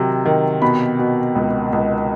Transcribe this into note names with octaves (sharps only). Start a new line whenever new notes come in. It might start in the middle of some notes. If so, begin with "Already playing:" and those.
Already playing: C3 D#3 F#3
D#3
B2 B5
B2
C#2
C#2